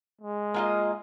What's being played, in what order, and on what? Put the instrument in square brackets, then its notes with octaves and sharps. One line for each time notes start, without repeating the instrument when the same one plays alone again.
[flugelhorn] G#3
[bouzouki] A#3 F4 D#5